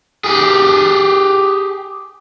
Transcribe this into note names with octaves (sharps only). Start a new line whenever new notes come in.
G4 G#4